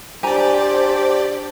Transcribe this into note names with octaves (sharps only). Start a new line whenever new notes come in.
D4 G4 C5 D5 G#5 A#5